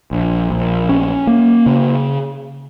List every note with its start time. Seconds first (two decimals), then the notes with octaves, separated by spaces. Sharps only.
0.11 A#1
0.50 A#1
0.89 C#4
1.27 A#3
1.66 C#3